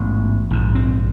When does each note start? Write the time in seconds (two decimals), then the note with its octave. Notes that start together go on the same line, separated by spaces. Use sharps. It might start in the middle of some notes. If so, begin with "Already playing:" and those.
Already playing: A1 G#2 B3
0.51 A#1 G#2
0.75 C4